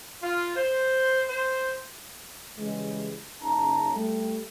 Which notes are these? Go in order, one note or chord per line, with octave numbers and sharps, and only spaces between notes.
F4
C5
C5
C#3 E3 G3 G#3
F#1 C#3 C#4 D#4 A5 A#5
G3 A3